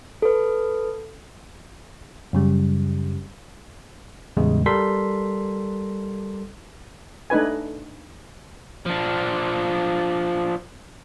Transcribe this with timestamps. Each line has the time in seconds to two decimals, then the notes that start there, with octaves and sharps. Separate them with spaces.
0.22 A4 B4
2.33 F#2 C#3 G3
4.37 E2 A2 C#3 G3 G#3
4.66 G3 A4 A#4 C6 B6
7.30 A3 D4 D#4 B4 G#5
8.86 F3 D4